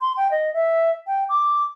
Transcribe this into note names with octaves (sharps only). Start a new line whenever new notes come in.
C6
G5
D#5
E5
G5
D6